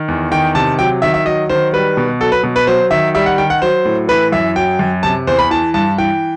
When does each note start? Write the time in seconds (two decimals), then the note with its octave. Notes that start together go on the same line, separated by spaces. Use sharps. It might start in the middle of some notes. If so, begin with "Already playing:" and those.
Already playing: D#3
0.08 E2
0.31 D#3 G5
0.55 C3 A5
0.79 F#3 G5
1.02 D#3 E5
1.14 E5
1.25 F#3 D#5
1.49 D#3 C5
1.73 G3 B4
1.97 B2
2.20 F#3 A4
2.32 B4
2.44 B2
2.56 B4
2.67 F#3 C5
2.91 D#3 E5
3.15 G3 E5
3.26 F#5
3.38 D#3 G5
3.50 F#5
3.62 F#3 C5
3.85 A2
4.09 E3 B4
4.32 F#2 E5
4.56 F#3 G5
4.79 F#2
5.03 C3 A5
5.27 E2 C5
5.39 B5
5.50 E3 A5
5.74 G2 A5
5.98 E3 G5